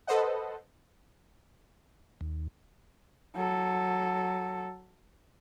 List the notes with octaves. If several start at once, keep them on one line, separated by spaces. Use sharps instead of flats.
A4 B4 C5 D#5 F#5
D#2
F#3 A4